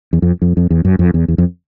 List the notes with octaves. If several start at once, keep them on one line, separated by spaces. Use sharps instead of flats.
E2
F2
F2
F2
E2
F#2
F2
E2
E2
F2